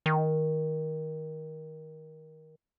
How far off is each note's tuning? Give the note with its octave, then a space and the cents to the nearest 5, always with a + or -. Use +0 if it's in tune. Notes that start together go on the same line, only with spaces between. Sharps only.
D#3 +15